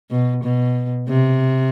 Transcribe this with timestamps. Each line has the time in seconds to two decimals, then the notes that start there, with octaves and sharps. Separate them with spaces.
0.11 B2
0.44 B2
1.09 C3